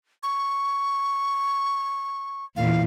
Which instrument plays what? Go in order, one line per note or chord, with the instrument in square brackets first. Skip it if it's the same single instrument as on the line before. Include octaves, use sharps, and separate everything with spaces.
[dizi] C#6
[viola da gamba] E2 A#2 E3 [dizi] F5